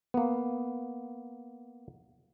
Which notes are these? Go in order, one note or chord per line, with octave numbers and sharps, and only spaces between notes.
A#3 B3